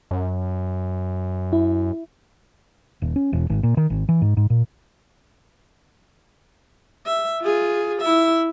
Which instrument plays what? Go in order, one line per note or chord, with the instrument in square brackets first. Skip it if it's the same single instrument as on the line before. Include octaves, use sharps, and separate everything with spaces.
[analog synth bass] F#2
[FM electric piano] E4
[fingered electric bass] D#1
C#4
E1
G#1
A#2
D#3
G#1
E3
G#2
G#2
A#2
[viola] E5
F4 G#4
E4 E5